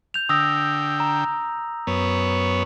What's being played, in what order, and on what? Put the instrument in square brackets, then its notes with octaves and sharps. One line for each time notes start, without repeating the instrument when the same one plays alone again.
[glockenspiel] G6 F7
[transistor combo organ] D3 G5 [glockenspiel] D#6 E6 A#6
[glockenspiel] A#5
[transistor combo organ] F#2 B3 C#5